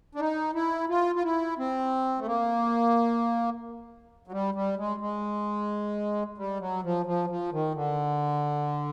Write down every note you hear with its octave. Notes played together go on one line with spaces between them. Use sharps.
D4
D#4
E4
F4
F4
E4
C4
A3
A#3
F#3
G3
G3
G#3
G#3
G3
F#3
F3
F3
F3
D#3
D3